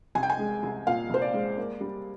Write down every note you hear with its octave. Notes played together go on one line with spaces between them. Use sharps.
C2 G#5
G5
G#5
G#3
C2
A#2 F5
C2 C5
D5
G#3
A#3
G3